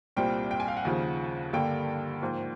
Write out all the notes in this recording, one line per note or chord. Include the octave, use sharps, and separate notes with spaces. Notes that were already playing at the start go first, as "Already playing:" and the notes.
C2 A#2 G3 C4 G5
G5
G#5
F5
F#5
D#2 C#3 F3
G2 D3 G3 A#3 G5
G#2 F3 A#3